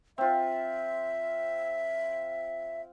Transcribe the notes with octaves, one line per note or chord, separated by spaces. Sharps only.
C4 F4 E5